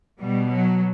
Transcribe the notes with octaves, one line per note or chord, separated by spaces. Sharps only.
B2 G3
F#3